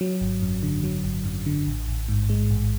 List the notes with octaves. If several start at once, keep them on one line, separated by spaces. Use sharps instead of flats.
F#3
G#1
F#2
D3
F#3
G#1
F#2
D3
A1
A1
G#2
G#3
A1